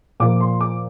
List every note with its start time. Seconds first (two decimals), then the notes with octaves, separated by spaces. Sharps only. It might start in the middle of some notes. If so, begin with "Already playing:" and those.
0.20 A#2 F3 A#3 D6
0.40 C6
0.61 D6